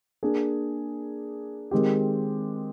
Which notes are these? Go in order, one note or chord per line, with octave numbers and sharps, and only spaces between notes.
A#3 D4 G#4
D#3 G#3 C4 G4